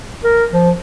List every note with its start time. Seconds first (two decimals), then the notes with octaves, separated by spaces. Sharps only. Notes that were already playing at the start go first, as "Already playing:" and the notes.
0.24 A#4
0.52 F3